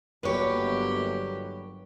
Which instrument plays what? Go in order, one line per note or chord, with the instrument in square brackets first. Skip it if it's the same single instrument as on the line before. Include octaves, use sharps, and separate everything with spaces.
[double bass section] G1 F#3 A#3 [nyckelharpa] G4 [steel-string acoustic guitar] B4 C#5